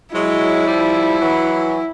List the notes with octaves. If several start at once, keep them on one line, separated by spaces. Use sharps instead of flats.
F#3 G#3 E4
F3 G3
E3 F#3